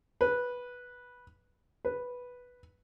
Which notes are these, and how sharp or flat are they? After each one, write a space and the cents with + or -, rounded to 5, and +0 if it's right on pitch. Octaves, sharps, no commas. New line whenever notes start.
B4 -10
B4 -5